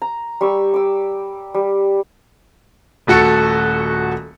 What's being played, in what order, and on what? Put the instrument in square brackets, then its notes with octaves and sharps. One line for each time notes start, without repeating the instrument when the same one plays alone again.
[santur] A#5
G3 C#6 E6
D6 E6
G3
[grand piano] D#1 A3 F#4 A4 C#7